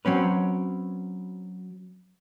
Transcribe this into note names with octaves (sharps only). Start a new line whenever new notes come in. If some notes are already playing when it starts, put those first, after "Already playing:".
F#3 C4 C#4 B4